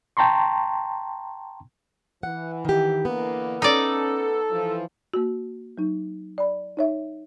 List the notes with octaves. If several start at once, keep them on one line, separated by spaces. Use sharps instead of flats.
G5 A5 A#5 C6 C#6
E3 F#5
D#3 G4
D3 E3 A#3 B3
C#4 D#4 A4 D5
E3 F3
A#3 F#4
F#3 D#4
D5 B5
D#4 C#5 E5